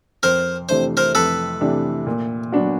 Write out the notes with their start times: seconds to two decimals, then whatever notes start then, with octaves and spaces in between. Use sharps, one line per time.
0.23 F2 A#4 C5
0.69 C3 E3 A3 D4 C5
0.97 A#4 C5
1.15 F2 A4 B4
1.61 C3 E3 A3 D4
2.06 A#2
2.52 F#3 B3 D4 F#4